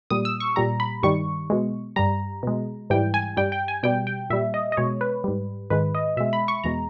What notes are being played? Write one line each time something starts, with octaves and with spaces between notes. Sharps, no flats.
A#2 G3 D#6
E6
C#6
A#2 G3 A#5
B5
G2 D#3 G3 C#6
B2 G#3
G2 G3 A#5
B2 G#3
G#2 E3 G3 G5
G#5
G2 G3 G5
G5
G#5
B2 G3 G5
G5
A#2 G3 E5
D#5
D#5
B2 G#3 C#5
B4
G#2 G3
G#2 D#3 G#3 B4
D#5
B2 G#3 E5
B5
C#6
E2 B2 G#3 A#5